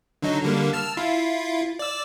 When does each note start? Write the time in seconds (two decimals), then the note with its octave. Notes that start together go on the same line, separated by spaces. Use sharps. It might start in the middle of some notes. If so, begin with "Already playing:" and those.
0.22 D3 F#3 D#4
0.43 D3 G3 A#3
0.73 A5 E6 F6
0.97 E4 F4
1.79 D5 E6